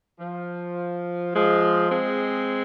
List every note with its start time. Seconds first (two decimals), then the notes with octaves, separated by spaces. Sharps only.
0.19 F3
1.34 F3 G#3
1.91 G#3 C4